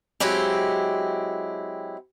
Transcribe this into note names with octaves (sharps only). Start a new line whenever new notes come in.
F#3 G#3 C4 E4 G4